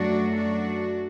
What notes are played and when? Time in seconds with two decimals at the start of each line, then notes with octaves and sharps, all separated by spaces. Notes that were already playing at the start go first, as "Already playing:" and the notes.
Already playing: F#2 F#3 A3 D4 F#4
0.36 D4 F#4